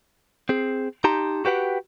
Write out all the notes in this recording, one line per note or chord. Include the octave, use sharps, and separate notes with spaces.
C4 G#4
D#4 G4 A5 A#5 C6
F#4 G4 B4 F#5 G5